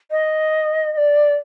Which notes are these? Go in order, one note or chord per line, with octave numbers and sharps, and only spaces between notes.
D#5
D#5
D5